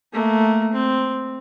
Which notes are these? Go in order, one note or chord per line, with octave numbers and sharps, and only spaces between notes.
A3 A#3
C4